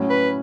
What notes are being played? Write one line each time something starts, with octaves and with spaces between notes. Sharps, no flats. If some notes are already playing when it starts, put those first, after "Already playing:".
Already playing: A2 F#3 C#4
B4